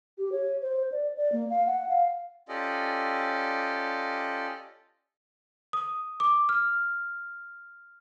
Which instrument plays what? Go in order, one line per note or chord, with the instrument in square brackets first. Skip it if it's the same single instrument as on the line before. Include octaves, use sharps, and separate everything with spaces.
[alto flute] G4
C#5
C5
D5
D5
A#3
F5
F#5
F5
[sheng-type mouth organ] C#4 F4 G4 A4 D5 D#5
[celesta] D#6
D6
F6